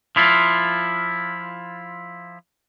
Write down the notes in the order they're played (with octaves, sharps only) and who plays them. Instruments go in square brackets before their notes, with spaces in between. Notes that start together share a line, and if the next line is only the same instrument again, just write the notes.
[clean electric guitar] F3 E4 F4